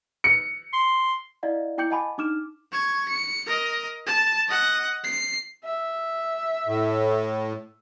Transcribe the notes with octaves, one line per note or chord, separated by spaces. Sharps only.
C#7
C6
E4 D5 D#5 F5 F#5
E4 G5 D6 G6 C#7 F#7
D#5 F#5 G#5 A5 B5 D6
D4 D#4 D6 F6 E7
C#6 G#6
C#7
A#4 D#5
A5
D#5 F#5
C7
E5
A2